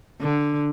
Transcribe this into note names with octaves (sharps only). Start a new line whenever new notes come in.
D3